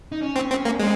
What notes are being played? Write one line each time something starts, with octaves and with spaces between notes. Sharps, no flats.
D#4
C#4
C4
C4
A#3
G#3 C4